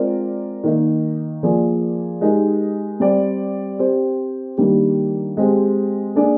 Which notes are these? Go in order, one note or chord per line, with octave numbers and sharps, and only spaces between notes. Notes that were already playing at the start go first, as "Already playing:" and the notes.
Already playing: G#3 C4 F4 A#4 D5
D#3 A#3 D#4
F3 A#3 F4 G#4 D5
G#3 D#4 G4 A#4
G3 C4 G4 D5
C4 G4 C5
D#3 G3 A#3 D4 G4
G#3 C4 G4
A#3 D4 G#4 D5